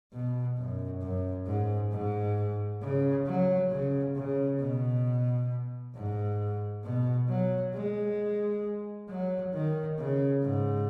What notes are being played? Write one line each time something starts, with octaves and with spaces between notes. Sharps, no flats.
B2
F#2
F#2
G#2
G#2
C#3
F#3
C#3
C#3
B2
G#2
B2
F#3
G#3
F#3
D#3
C#3
G#2